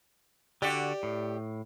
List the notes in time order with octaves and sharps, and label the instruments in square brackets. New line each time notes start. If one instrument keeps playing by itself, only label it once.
[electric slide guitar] D3 F#4 [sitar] G4 D5
[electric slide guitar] A2